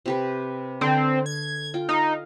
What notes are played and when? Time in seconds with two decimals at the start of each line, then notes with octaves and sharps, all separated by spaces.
0.06 C3 G4 B4
0.81 D3 C4
1.26 G#6
1.74 F4 G5
1.89 D#4 F5